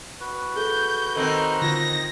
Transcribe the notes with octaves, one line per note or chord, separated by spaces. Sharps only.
F#4 B4
G#4 A4 G6
D#3 C4 A4 A#4
D3 F4 G#6 A#6